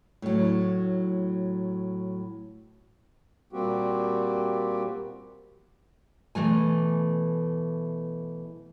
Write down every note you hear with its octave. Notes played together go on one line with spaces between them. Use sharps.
A2 F#3
A#2 G3 A#3 C4 F#4 G4
B2 E3 A3 G#5